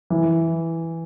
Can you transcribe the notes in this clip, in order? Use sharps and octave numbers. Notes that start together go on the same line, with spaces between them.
E3